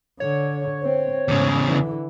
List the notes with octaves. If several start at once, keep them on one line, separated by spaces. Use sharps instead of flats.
D3 C#5
C4
E2 G#2 C#3
D3 E3